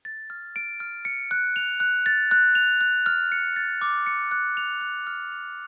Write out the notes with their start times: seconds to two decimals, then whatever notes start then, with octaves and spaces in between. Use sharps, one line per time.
0.05 A6
0.30 F6
0.56 D7
0.80 F6
1.05 C#7
1.31 F#6
1.56 F7
1.80 F#6
2.06 A6
2.31 F#6
2.55 F7
2.81 F#6
3.06 F6
3.32 C#7
3.56 A6
3.81 D6
4.06 C#7
4.32 F#6
4.57 F7
4.81 F#6
5.07 F6
5.32 F7